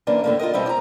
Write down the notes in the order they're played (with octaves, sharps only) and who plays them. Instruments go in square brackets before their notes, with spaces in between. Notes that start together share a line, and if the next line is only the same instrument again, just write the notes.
[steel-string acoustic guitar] F#2 E3 A#3 D4
A2 D3 A#3
F4 F#4 A#4 D#5
B2 G3 C4 E4
D5 A#5